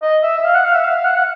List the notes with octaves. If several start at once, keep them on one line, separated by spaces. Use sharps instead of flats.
D#5
E5
E5
F5
F#5
F5
E5
F5
F5
F#5
F#5